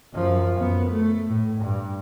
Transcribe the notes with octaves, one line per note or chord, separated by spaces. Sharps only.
F#2 F3
F#2 B3
A3
A2
G2